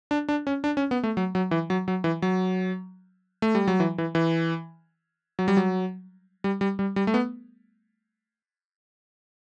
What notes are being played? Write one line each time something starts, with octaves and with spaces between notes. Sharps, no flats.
D4
D4
C#4
D4
C#4
B3
A3
F#3
F#3
E3
F#3
F#3
E3
F#3
A3
G3
F#3
E3
E3
E3
F#3
G3
F#3
G3
G3
G3
G3
A3
B3